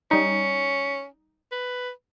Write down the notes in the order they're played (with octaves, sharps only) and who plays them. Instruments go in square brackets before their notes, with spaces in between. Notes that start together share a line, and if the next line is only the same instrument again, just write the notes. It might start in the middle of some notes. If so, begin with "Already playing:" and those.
[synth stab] G3 D#4 [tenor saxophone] C#4
[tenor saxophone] B4